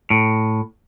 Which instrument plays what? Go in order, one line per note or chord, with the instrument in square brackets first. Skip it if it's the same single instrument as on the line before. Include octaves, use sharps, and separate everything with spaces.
[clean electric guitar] A2